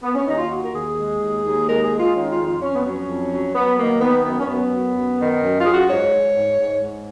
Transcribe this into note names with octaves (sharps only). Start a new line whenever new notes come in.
B3
C#4
D#2 D#4
F4
D#3 F#4
A#4
D#2 G#4
G#3
D#2
D#2
G#3 A#4
G#4
G#3
F4
D#3 C#4
F4
F2
F4
F2 C#4
B3
F#3 C#4
F2
F#3
F#3 B3
D#3 A#3
D#3 B3
F#2 B3
C#4
F#2 B3
F#2
F#2
D#3
F#2
F4
F#2 G#4
F#4
G#2 C#5
G#2
G#2
G#2
G#2